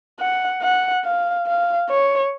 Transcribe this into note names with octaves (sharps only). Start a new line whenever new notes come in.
F#5
F#5
F5
F5
C#5